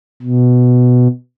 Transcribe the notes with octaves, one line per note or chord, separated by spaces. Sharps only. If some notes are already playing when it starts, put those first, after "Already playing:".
B2